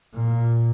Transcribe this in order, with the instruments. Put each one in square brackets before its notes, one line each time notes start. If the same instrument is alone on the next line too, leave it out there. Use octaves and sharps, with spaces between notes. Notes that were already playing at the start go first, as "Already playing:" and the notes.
[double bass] A#2